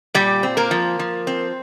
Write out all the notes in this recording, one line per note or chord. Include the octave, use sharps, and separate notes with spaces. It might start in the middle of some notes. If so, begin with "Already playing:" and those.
A#2 G3 G4
C4
A#3 A#4
F3
F3
C4